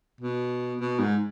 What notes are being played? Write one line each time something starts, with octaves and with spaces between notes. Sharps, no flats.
B2
B2
G#2